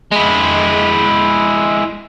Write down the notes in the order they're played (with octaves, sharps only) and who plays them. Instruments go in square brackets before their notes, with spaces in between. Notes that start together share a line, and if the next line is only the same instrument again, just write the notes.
[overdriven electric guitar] G#3 E4